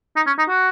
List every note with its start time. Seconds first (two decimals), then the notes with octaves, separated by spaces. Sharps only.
0.16 D#4
0.27 C#4
0.38 D#4
0.49 F#4